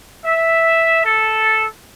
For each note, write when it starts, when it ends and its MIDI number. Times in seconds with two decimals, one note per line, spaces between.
0.25 1.02 76
1.05 1.65 69